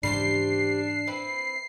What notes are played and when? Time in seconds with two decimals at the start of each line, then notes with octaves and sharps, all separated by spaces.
0.03 G#2 C#3 E3 G3 D4 G4 C5 C7
1.07 C4 E4 B4